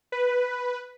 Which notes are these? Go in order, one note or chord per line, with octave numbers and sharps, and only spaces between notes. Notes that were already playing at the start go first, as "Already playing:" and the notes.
B4